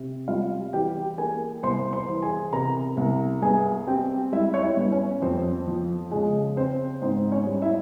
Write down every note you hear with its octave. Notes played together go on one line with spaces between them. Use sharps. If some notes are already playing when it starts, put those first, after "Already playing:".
Already playing: C3
G3 F4 F5
E3 G4 G5
A#3 G#4 G#5
C2 C5 C6
C5 C6
E3
G#4 G#5
C3 A#4 A#5
C2
G2 G#4 G#5
C4 G4 G5
G3 E4 E5
C#5
E4 E5
G2
C#4 C#5
F2 C4 C5
F3
C#3 G#3 G#4
C4 C5
G#2 C4 C5
C#4 C#5
G3
E4 E5